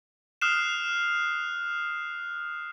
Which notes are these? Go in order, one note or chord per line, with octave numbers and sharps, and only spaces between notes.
D#6 F6 F#6 C7 E7